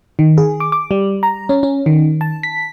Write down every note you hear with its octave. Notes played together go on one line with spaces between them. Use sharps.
D#3
G#4
D6
D6
G3
A#5
C#4
C#4
D#3
A5
B6